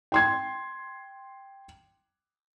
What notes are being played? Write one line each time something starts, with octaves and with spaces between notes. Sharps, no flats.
G5 C6 G#6